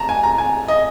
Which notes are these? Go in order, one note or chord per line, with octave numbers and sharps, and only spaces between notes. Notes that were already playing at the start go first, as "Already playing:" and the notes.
Already playing: A5 A#5
G#5
A#5
G#5
D#5